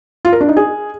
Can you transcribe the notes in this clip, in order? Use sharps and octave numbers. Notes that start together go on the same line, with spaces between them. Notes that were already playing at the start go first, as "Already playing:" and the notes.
F4
A#4
D4
D#4
G#4